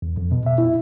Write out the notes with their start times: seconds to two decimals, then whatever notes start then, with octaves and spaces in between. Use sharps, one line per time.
0.02 E2
0.17 F2
0.32 B2
0.46 E5
0.58 E4